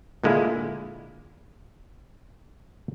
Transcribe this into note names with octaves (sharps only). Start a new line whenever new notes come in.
A#2 D3 G#3 A#3 E4